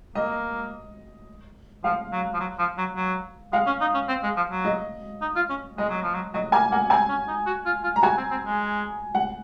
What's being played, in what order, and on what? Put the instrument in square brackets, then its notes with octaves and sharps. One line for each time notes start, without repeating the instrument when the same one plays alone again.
[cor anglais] A#3 [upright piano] D#5
[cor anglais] F3 [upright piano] F5
[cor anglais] F#3
F3
F#3
F3
F#3
F#3
[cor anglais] G#3 [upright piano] F5
[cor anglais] C#4
D#4
C#4
C4
G#3
F3
F#3
[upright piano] D#5
[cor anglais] D#4
F4
C#4
[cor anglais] G#3 [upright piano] D#5
[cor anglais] F#3
F3
F#3
[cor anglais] F#3 [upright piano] D#5
[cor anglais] A#3 [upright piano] G#5
[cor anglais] A#3 [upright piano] F#5
[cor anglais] C4 [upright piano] G#5
[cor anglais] C#4
D#4
F#4
F4
F4
[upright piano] A#5
[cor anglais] F#4 [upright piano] G#5
[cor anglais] C4
C4
G#3
[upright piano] F#5